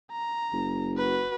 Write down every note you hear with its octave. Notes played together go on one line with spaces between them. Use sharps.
A#5
F#1
F#4 B4